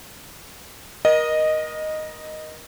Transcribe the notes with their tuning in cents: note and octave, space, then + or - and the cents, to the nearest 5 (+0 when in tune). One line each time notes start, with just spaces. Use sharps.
A#4 +30 D#5 -5